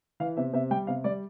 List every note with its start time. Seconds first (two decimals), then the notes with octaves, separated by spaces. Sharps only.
0.20 E3 F5
0.37 C3 E5
0.53 C3 E5
0.71 G3 G5
0.87 C3 F5
1.04 G3 D5